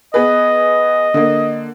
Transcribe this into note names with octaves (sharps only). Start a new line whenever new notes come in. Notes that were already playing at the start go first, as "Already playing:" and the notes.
B3 G#4 B4 D#5
D3 A#3